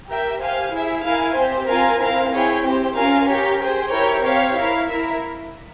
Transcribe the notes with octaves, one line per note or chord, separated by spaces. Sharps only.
G4 A#4 E5 G5
G4 C5 F5 G#5
E4 G#4 E5
E4 A#4 F5 G#5
C4 G4 C5
C4 F4 A#4 F5 G#5
C4 E4 A#4 F5
E4 G#4 C#5 G5
C4 G4 C5
C#4 F4 A#4 F5 G#5
G4 A#4 C#5
G#4 C5 G5
E4 G4 A#4 C#5 G5
C4 G4 C#5 F5
E4 A#4 F5
E4 A#4 E5